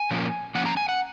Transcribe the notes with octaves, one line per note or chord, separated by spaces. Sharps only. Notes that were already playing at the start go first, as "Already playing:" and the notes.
Already playing: G#5
A#2 F3 A#3 C#4
F3 A#3 C#4 F#5
A#5
G#5
F#5